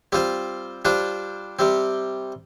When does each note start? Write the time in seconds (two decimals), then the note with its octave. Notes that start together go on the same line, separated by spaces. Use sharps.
0.12 G3 C4 F4 C5
0.85 G3 D4 F4 C5
1.59 C3 G3 C4